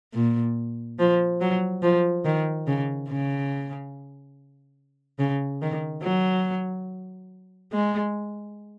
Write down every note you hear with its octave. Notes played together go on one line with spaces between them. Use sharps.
A#2
F3
F#3
F3
D#3
C#3
C#3
C#3
D#3
F#3
G#3